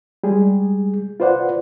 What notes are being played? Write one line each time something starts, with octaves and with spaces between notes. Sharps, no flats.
G3 G#3 G#4
F4 B4 C5 D5 F#5